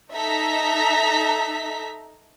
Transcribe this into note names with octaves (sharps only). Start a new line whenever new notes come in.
D#4 A4 E5 A#5 B6